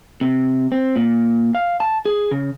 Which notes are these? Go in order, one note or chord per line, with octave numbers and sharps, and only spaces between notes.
C3
C4
A#2
F5
A5
G#4
C#3